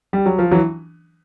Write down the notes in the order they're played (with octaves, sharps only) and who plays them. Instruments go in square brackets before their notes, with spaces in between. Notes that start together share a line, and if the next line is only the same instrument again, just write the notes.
[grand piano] G3
F#3
F3
E3 F#3